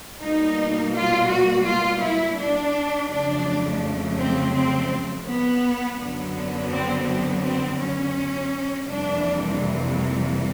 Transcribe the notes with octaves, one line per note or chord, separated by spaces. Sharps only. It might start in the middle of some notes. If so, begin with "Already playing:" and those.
B2 G3 A#3 D#4
F4
F#4
F4
E4
D4
F2 C#3 F#3 A3 D4
C4
C4
B3
F#2 D3 F#3 B3
C4
C4
C4
C#4
F2 C3 E3 G3 A#3 D4